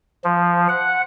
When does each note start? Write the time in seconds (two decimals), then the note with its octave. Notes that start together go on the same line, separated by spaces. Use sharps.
0.24 F3
0.69 F#5